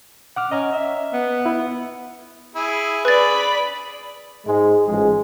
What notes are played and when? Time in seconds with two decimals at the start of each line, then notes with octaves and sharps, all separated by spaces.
0.36 F#5 D6 F6
0.51 C#4 D#5 A#5 F6
0.72 E5
1.13 B3
1.46 E4 B4
2.55 E4 G#4
3.05 G#4 B4 D5 B5 A6
4.46 G#2 G#3
4.87 A1 F3 G#3